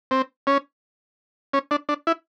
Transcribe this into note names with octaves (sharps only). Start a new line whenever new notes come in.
C4
C#4
C#4
D4
D4
E4